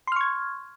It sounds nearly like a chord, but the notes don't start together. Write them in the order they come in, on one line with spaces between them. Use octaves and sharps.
C6 F6 C#6 G#6